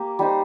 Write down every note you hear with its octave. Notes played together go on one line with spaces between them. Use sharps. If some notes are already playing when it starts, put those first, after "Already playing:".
Already playing: A#3 G4
G3 D#4 C5